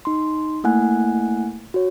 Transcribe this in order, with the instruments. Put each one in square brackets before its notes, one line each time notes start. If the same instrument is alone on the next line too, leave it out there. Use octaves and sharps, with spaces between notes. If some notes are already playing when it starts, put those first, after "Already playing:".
[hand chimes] D#4 C6
A3 A#3 E4 F#5 G#5 F#6
F#4 C#5